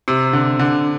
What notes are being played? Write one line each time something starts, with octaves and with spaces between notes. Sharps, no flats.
C3
D3
D3